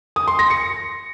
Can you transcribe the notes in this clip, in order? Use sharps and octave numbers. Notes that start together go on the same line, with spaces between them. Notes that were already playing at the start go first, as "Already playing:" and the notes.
D#6
C6
A#6
C#7